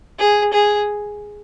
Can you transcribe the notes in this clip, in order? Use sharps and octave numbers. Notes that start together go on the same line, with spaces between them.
G#4
G#4